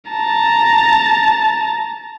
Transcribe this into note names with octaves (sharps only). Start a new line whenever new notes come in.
A5 A#5